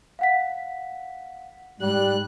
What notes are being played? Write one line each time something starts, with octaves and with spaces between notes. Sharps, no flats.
F5 F#5 B6
G#2 G3 F#6